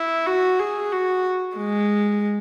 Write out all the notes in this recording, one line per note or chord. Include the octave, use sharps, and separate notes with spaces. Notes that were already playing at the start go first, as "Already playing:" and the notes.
Already playing: E4
F#4
G#4
F#4
G#3